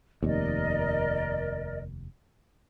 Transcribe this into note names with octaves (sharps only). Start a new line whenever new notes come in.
F1 D#2 A#4 D5 D#5